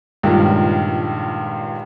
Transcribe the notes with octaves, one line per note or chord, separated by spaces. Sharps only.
C#2 G2 A#2 D#3